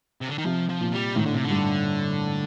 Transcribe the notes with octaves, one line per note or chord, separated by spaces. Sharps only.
C3
D3
D#3
C3 F3
F3
A#2
G3
A2 D#3
D3
C3
D3
G2